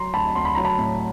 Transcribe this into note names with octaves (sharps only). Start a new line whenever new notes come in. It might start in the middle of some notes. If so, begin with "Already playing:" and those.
Already playing: F#3 A#5 C6
D2 A5 B5
D2 C6
B5
F#3 A#5
A5 B5
A2